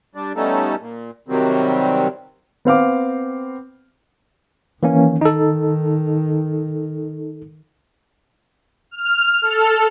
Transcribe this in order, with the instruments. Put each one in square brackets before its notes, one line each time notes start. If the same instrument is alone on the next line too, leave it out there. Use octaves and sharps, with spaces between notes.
[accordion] G3 D4 D5
G3 A3 B3 C#4 D#4 A4
A#2
C3 D#3 F#3 G3 C4
[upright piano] B3 C4 F5 D6
[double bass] D#3 [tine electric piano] E3 A#3 C#4
[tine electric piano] D#4 A4
[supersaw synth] F6
A4